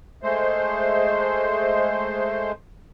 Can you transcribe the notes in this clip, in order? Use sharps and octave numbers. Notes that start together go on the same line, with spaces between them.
G#3 A3 C5